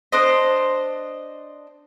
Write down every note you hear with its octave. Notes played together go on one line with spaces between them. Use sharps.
D4 C5 D#5